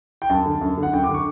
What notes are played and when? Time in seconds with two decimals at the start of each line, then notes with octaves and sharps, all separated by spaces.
0.22 G5
0.30 F#2 A5
0.46 D3
0.61 F#2
0.77 D3
0.83 F#5
0.93 F#2 G5
1.04 D6
1.09 D3
1.14 C#6